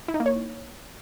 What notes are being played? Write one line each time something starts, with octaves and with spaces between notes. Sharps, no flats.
E4
D#4
A#3
C#5